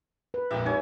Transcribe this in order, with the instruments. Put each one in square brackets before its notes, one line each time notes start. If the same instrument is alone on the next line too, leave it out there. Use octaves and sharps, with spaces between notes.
[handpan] B4
[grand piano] A#1 F2 G#2 [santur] G4 E5
[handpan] D#4 G4 [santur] C#5 G#5